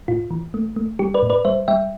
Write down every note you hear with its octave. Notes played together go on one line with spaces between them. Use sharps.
A2 F4
E3
A3
A3
G3 G4
B4 D5
A2
B4 D5
G3 C5 E5
G3 E5 G5